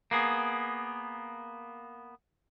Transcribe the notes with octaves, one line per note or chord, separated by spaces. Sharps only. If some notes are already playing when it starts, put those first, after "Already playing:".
A#3 B3 G#4